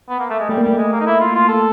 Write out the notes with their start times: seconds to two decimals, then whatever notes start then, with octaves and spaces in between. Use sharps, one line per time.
0.09 B3
0.19 A#3
0.30 A3
0.39 G#3
0.49 G3 A3
0.58 A#3
0.63 G3 A3
0.78 G#3
0.92 A#3
1.00 D#4
1.06 E4
1.21 F4
1.35 F4
1.48 A4